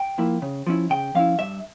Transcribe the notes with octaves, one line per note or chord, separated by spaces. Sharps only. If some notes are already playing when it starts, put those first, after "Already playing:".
Already playing: G5
F3 A#3 E4
C#3
F3 C#4 E4
C#3 G5
F3 C#4 E4 F5
G2 E5